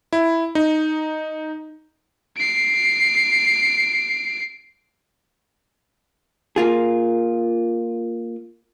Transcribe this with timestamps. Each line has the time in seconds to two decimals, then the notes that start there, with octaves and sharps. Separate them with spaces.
0.13 E4
0.55 D#4
2.37 C7 D7
6.56 A#3 F4 G#4